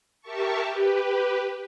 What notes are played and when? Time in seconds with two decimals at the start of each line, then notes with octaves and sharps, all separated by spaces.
0.21 G4 A#4 E5 A5 C#6
0.63 G4 B4